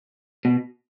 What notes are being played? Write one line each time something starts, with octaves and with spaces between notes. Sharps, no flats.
B2